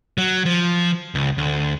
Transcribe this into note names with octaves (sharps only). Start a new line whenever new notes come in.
F#3
F3
C#2
D2